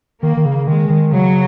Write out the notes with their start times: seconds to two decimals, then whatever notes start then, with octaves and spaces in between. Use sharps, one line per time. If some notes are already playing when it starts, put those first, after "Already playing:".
0.23 D#3 A#3
0.37 D#3
0.45 C#3
0.67 D#3 G#3
0.90 D#3
1.12 C#3 F#3